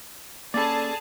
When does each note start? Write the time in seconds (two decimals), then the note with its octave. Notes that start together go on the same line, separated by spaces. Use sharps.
0.54 A#3 C#4 G#4 A4 D5 A5 B5